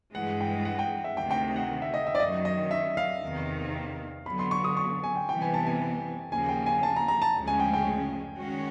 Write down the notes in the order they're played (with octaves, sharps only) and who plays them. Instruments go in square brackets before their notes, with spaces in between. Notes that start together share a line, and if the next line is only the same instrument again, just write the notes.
[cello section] G2 E3 G#3 [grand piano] F#5
[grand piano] G5
F#5
G5
E5
[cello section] D2 C3 D#3 [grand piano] G5
[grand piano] G5
F#5
E5
D#5
E5
D5
[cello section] F#2 D#3 F#3 [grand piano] D#5
[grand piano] D#5
E5
F5
[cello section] E2 C3 D#3
[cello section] D3 F#3 B3 [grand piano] B5
[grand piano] C6
C#6
D#6
C#6
G#5
G5
[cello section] C3 E3 G3 B3 [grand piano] G5
[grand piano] G#5
A5
G#5
[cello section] D#2 C#3 F3 A#3 [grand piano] G#5
[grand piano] G5
G#5
A5
A#5
A#5
A5
[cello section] D2 C#3 F3 G#3 C#4
[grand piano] G#5
G5
G5
[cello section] D#3 G#3 C#4 F#4